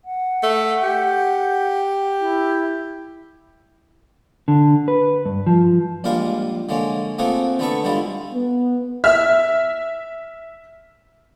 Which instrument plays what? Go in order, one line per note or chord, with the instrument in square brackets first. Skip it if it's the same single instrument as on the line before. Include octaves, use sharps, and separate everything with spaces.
[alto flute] F#5
[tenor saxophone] A3
G4
[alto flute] E4
[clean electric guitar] D3
B4
G2
F3
[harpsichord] A#1 A#2 G3 G#3 A#4 F5
D3 G#3 A#3 C#4
A3 A#3 C4 F4 G#4 F#5
D3 A3 B3 E5 A5 C#6
D3 G3 G#3 E4 F4
[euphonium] B3
[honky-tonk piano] E5 F6